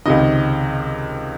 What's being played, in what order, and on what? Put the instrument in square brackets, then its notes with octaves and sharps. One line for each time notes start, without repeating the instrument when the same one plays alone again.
[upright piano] C#2 C3 D#3 D#5